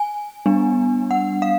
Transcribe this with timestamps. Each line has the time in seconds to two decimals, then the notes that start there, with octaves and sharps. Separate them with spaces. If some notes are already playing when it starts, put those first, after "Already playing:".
Already playing: G#5
0.46 G3 B3 D4
1.11 F#5
1.42 F5